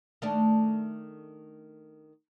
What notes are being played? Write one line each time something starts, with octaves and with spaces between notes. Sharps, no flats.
D#3 A3 D4